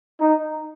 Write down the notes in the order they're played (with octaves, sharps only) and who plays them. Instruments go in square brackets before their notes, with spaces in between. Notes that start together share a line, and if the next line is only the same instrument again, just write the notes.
[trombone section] D#4